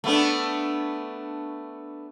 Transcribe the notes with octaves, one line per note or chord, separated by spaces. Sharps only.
A3 B3 D4